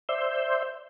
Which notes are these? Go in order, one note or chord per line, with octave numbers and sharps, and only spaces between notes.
C5 D5 E5 C6 E6 G6